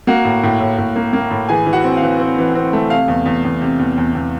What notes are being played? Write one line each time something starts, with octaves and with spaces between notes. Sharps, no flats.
A#3 F#4 F#5
A2
A2
A2
A2
A#3
A#3
A2
E3 G#4 G#5
E3
F#4 F#5
C4
F5
E3
C4
E3
C4
A3
C3 F5
E2
E2
E2
C3
E2
E2
E2